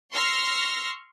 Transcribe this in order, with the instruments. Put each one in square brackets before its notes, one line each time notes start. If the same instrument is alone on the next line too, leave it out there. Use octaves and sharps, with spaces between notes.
[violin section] C6 C#6 E6 F6 A#6 C7